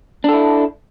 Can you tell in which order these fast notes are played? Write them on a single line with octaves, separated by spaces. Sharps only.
D4 A4 E4